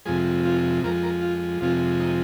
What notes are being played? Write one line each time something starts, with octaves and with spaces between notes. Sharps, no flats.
F2 C3 F3 G#3 G#4
F4
F2 F3 G#3 A#4
A#4
F4
F2 C3 F3 G#3 F4
D#4